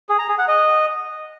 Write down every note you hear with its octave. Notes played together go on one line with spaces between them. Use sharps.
G#4
A#5
G#4
F#5
D#5